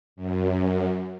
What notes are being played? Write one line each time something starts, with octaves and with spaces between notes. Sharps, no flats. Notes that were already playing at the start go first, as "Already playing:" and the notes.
F#2